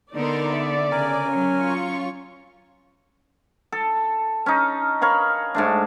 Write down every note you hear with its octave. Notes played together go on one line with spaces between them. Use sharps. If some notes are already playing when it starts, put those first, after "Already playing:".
D3 B3 D#4 A#4 D5 C6
E5
C#3 A#4 G#5
F#3 C#4
F4 C#6
A4
C#4 D#4
A#4 C#5 F5 B5
G#2 A3 D4